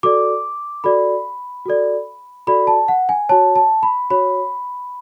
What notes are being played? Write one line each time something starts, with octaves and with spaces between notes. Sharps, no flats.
F#4 A4 D5 D6
F#4 A4 D5 B5
F#4 A4 D5
F#4 A4 D5 B5
A5
F#5
G#5
F#4 C#5 A5
A5
B5
F#4 C#5 B5